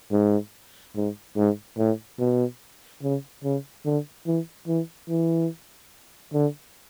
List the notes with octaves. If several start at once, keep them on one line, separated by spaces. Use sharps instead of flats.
G#2
G#2
G#2
A2
B2
C#3
C#3
D3
E3
E3
E3
D3